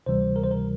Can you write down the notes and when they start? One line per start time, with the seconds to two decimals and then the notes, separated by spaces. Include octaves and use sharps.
0.06 D2 C3 E3 G3 C5
0.36 A#4
0.43 C5
0.51 A#4